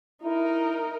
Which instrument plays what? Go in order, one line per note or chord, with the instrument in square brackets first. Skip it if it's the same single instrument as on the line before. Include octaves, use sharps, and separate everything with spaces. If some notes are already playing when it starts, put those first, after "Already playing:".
[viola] D#4 A#4 [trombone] E4